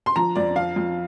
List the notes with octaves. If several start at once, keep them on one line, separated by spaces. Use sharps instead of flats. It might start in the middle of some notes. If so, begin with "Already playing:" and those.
C6
F3 A#5
F2 D5
F3 F5
F2